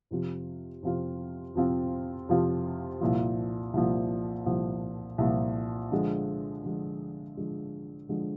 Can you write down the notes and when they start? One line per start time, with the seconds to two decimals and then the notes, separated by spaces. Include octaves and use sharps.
0.11 F2 C3 F3 C4 F4
0.83 F2 C3 F3 C4 F4
1.55 F2 C3 F3 C4 F4
2.29 F2 C3 F3 C4 F4
3.01 C2 A#2 F3
3.73 C2 A#2 F3
4.46 C2 A#2 F3
5.18 C2 A#2 F3
5.91 D3 F3 G#3
6.64 D3 F3 G#3
7.37 D3 F3 G#3
8.09 D3 F3 G#3